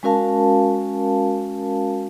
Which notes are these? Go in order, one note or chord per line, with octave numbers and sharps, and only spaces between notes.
G#3 C#4 F#4 A#4 F5 A5